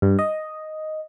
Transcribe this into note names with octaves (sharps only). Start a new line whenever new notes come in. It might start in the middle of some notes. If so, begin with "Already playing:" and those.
G2
D#5